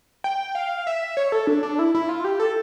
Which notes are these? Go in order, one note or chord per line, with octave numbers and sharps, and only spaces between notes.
G5
F5
E5
C#5
A4
D4
D4
E4
E4
F4
G4
A4